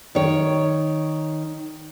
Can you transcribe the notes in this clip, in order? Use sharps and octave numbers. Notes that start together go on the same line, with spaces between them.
D#3 C#5